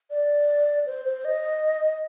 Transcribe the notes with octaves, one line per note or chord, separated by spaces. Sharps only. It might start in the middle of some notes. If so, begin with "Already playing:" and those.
D5
C5
C5
D#5